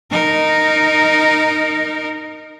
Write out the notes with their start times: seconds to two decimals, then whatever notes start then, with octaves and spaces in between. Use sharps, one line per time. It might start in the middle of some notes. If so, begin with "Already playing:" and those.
0.11 D#4 A#4